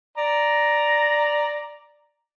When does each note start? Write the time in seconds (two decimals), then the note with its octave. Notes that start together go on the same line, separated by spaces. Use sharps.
0.18 D5 A#5